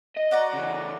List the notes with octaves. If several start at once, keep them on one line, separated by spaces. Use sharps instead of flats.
D#5
F#4 D5 A#5
C#3 E3